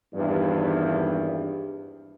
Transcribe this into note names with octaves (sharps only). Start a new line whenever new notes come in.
G#1 E2 G2